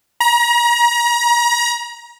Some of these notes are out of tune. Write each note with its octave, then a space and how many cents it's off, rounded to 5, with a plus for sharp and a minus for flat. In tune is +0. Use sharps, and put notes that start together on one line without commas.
A#5 +35